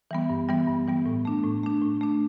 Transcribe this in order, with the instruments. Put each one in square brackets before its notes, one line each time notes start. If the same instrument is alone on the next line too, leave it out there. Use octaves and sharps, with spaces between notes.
[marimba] E3 G3 B3
G2
E3 G3 B3
G2
E3 G3 B3
A2
A3 D4
A2
A3 D4
A2
A3 D4